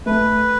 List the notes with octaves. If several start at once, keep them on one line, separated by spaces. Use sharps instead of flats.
A3 B4